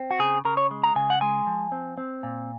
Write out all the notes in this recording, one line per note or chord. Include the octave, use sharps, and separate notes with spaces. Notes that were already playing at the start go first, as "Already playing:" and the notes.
Already playing: C4
F#4
C#3 G#4
C#3 A#4
C#5
G#3
A#5
C#3 G#5
F#5
G#3 G#5
F3
C4
C4
A#2